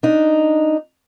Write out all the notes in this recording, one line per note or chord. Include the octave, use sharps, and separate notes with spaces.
D4 D#4